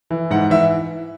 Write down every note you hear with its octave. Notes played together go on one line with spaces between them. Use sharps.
E3
G#2 F#5
E3 E5